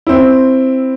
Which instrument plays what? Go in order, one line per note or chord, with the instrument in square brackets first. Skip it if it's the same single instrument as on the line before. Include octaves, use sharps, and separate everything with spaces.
[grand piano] C4 E4